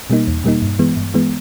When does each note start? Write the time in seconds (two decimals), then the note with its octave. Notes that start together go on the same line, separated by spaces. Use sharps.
0.10 B2 G3 A#3 D#4
0.27 E2
0.44 B2 G3 A#3 D#4
0.62 G2
0.79 E3 G#3 B3
0.96 G2
1.14 E3 G#3 B3